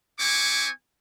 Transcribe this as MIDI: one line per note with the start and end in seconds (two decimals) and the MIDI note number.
0.18 0.67 60
0.18 0.67 64
0.18 0.67 80
0.18 0.67 85
0.18 0.67 86